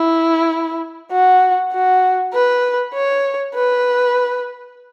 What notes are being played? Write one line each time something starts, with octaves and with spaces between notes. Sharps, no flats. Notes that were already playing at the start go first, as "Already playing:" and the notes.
Already playing: E4
F#4
F#4
B4
C#5
B4